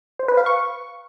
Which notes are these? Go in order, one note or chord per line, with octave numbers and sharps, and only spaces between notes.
C5
B4
F5
C#6